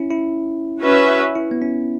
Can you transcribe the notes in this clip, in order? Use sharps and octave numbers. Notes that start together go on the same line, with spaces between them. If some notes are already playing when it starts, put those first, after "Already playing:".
Already playing: C#4 E4
E4
C#4 F#4 B4 E5
E4
B3
C#4